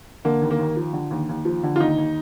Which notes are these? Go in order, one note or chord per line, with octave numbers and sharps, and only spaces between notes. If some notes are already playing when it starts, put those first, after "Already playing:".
D3 A#3
D#2
A#3
D#2
F3
D3
D#2
D#2
F3
D3
F4
D#2 D#4
D#2